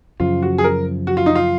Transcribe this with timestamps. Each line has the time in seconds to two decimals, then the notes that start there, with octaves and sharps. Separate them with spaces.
0.20 F#2 C#3 F3 F4
0.42 F#4
0.58 G#4
0.64 A#4
1.07 F#4
1.17 F4
1.26 D#4
1.35 F4